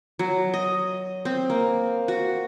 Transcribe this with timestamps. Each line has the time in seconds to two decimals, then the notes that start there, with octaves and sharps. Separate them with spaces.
0.19 F#3
0.54 D#5
1.25 C4
1.50 A#3
2.08 F#4